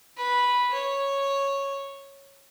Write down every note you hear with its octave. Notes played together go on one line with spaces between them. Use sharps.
B4
C#5